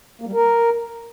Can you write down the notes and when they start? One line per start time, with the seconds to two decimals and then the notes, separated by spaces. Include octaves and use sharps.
0.21 A#3
0.27 G3
0.33 A#4